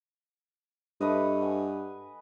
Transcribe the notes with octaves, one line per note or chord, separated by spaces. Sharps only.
G2 A3 B4 D#5
F#5 G#5